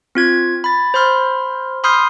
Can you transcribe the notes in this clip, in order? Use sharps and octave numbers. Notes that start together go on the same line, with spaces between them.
C4 F4 G#6
B5 A6
C5 B5 C6 F6
B5 C6 D#6 F6 G6 C7